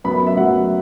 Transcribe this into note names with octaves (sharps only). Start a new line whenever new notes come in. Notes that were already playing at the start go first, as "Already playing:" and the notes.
F#2 F#3 B3 B5
E5
F#2 F#3 B3 F#5